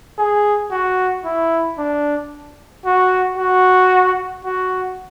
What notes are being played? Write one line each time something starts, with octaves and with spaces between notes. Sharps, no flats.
G#4
F#4
E4
D4
F#4
F#4
F#4